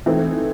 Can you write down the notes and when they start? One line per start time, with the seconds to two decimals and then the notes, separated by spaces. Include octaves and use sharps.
0.06 E3 A3 C4 D#4